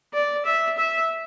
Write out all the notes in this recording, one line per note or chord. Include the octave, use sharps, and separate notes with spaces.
D5
E5
E5